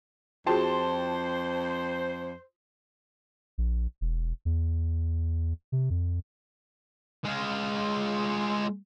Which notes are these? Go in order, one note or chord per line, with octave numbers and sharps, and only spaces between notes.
F2 F4 F#4 G#4 C5 G5 A5 C6
A#1
E1
E2
C3
F2
G#3 F4